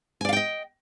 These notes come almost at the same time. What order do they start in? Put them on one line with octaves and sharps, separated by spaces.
G#5 D5 F5 G5 D#5